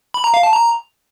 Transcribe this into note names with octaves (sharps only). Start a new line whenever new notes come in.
B5
A#5
F5
A5
A#5